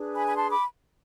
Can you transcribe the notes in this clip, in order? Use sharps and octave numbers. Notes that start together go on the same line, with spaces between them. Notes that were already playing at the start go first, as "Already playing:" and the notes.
Already playing: D4 G#4 B4
G#5 B5
B5
A5 C6
B5 D6